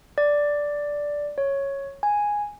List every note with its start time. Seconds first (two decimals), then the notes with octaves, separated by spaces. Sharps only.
0.18 D5
1.38 C#5
2.03 G#5